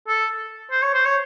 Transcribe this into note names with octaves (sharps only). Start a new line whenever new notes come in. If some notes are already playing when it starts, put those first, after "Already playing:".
A4
C5
C#5
C5
C#5